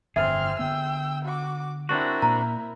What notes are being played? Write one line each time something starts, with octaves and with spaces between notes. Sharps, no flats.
G1 F2 A2 C4 G#4 E5 F6
D3 B3 G5 E6
F#4 D6
C4 D4 E4 F#4 A#4 C#6
A#2 A#5